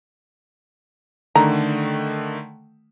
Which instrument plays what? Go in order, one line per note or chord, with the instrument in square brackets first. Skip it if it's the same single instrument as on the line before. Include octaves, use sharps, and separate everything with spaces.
[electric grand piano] D3 D#3 A3 [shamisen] A#5